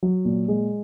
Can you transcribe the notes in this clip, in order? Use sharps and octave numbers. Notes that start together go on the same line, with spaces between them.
F#3
A#2
G#3